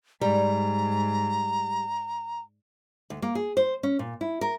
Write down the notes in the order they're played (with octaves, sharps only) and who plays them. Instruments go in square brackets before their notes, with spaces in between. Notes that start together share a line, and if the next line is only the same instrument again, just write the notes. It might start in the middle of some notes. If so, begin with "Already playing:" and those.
[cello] G#2 [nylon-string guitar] G3 [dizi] A#5
[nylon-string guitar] D2
A#3
G#4
C5
C#4
A#2
E4
A#4